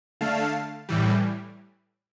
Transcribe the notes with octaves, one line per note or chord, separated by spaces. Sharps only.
D3 A3 F5 A5
A2 E3 G3